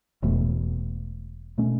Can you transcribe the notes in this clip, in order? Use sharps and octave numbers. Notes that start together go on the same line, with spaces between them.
E1 E2 B2 A3
B2 A3 C#4